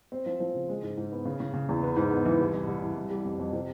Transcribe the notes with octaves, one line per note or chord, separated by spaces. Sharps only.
C4
F3
F3
C#3
G#3
G#2
G#2
B3
C#3
C#3
C#3
E2
B3
G#2
B3
E3
C2
C2
C2
C2
E3
G3
F2
F2
C3